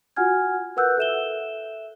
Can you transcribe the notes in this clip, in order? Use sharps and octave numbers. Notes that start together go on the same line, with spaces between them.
F4 F#4 F#5 G#5 F6 G#6
A#4 B4 F#5 E6 F#6 G6
A4 E5 E7 G7